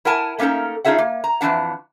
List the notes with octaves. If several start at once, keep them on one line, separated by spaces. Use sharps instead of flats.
E4 A#4 F#5 G#5 A5
A3 A#3 C#4 D#4 A4 A#4
D4 D#4 F4 G#4 E5 F#5
A#3
A#5
F2 G#2 E3 D4 F#5